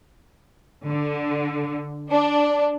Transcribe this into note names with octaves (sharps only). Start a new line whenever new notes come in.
D3
D4